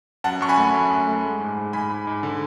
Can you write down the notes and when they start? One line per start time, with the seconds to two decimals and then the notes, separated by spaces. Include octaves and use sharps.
0.24 F#2 F#5 A5
0.41 F#2 C#6
0.49 G#5 B5
0.57 A3
0.74 F#2
0.91 F#2
1.07 A3
1.24 G#3
1.40 G#2
1.57 G#2
1.73 G#2 G#5 B5
1.90 G#2
2.07 G#2
2.23 D3